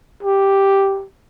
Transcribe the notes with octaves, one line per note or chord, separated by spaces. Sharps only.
G4